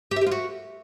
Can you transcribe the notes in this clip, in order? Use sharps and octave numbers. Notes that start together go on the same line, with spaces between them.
G4
E5
G4
F4
F#4